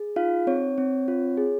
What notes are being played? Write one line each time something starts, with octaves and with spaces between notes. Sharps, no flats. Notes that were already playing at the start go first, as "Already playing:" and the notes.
Already playing: G#4
D#4 F4 F5
C4 C#5
C4
F4
G#4